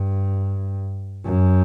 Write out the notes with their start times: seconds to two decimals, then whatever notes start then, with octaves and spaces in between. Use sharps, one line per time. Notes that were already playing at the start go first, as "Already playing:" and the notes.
Already playing: G2
1.25 F#2